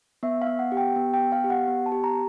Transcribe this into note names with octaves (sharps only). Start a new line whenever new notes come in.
B3 E5
F5
B3
F#5
G4
G5
B3
G5
B3
F5
G4
F#5
B3
A5
G4
A#5